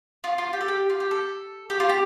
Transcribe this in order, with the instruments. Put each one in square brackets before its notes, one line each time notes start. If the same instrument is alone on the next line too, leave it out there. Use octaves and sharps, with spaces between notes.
[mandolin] F4
F4
G4
A4
G4
F4
G4
A4
G4
F4
G4